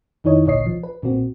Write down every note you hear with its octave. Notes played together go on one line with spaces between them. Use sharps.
F2 D#3 D#4 E4 C#5 D#5
A1 D2 A#2 C#5 D#5 C7
C2 F3
B4
B1 A#2 A#3 C4 F#4